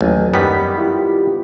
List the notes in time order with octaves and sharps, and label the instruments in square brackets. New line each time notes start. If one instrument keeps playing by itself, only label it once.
[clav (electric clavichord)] A1 [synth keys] D#2 F#3 G#5
[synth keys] F#2 B6 [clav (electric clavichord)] D#3 G3 B3
[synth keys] E4 F4 G4